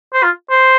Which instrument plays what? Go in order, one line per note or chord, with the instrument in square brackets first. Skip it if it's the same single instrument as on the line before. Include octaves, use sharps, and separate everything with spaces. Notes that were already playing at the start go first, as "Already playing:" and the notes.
[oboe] C5
F4
C5